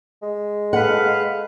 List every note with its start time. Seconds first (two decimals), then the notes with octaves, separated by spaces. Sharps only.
0.22 G#3
0.73 A4 B4 F5 F#5